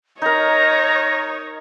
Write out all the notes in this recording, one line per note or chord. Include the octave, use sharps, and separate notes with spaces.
D#4 A#4 C#5 D#5 A#5